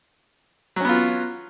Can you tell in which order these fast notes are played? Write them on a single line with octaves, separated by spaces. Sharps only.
F#3 C#4 B3 F4